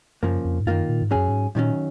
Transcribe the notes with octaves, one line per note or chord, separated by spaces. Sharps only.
F#2 C#3 F3 A#3
F2
G#2
F#2 D#3 A#3 F4
A#2
G#2
F#2 F#3 C#4 G#4
G#2
F#2 A#2 D#3 F#3 C#4